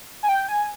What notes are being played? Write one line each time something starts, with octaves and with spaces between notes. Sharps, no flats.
G#5
G5
G#5